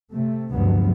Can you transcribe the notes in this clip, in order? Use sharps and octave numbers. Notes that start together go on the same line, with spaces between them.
C3 A3
D2 G2 C3 F3 F#3 B3